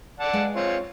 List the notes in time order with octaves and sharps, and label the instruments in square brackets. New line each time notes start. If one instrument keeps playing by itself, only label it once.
[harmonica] D5 F#5 A5
[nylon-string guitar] G#3 B4 F5
[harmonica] C4 F4 C#5